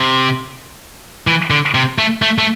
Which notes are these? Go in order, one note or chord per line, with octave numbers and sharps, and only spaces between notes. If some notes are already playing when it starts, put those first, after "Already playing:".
Already playing: C3
E3
D3
C3
A3
A3
A3